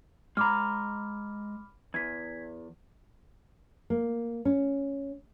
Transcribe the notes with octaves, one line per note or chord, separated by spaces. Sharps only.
G#3 A#5 B5 D6 F6
E2 G#6 B6
A#3
C#4